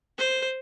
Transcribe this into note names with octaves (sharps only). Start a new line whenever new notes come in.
C5